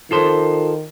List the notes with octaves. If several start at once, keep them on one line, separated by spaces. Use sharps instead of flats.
D#3 F4 A4 C5